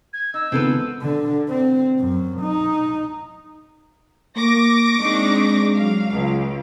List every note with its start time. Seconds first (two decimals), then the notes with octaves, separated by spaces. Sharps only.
0.13 G#6
0.34 D#4 E6
0.52 C#2 D#3 B3 C4 A4 B4
1.02 D3
1.49 C4
1.99 F#2
2.41 D#4
4.36 A#3 C#6 D6 A#6
5.00 G#3 C4 D4 D#4
5.76 F#3 F5
6.11 C#2